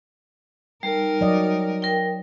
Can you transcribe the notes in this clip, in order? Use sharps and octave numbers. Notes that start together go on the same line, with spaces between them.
G3 D#4 A#4
F#3 D5 D#5
A#4 G5